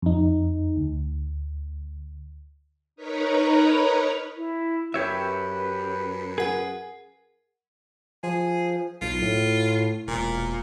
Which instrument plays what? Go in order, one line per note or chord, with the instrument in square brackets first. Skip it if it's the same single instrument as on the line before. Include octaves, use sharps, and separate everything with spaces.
[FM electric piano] F2 D#4
D2
[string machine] D#4 A#4 B4 C#5 A#5 B5
[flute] E4
[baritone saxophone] F#2 [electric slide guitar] G4 C#5 E5 [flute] B4
[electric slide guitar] G#4 [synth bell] A#4 F#5
[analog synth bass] F3 [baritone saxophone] G#4
[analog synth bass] B1 [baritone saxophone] F4
[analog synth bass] A2
[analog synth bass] E1 [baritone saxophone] A#2